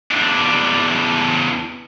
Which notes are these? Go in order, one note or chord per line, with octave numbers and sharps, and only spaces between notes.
E2 D4